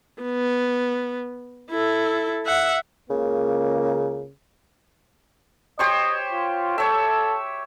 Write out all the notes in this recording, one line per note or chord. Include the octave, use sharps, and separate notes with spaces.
B3
E4 A4
E5 F#5
C#2 C#3 A#3
G4 C5 C#5 D#5
F4
A4 C#5 E5